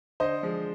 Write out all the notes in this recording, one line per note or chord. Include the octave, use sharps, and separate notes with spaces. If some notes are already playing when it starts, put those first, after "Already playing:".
D3 C5 D#5
F3 G#3